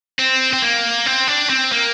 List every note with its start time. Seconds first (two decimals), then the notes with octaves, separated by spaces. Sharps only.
0.19 C4
0.53 C4
0.62 A#3
1.06 C4
1.28 D4
1.49 C4
1.72 A#3